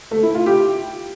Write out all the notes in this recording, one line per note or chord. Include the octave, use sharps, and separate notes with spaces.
A3
E4
F4
G4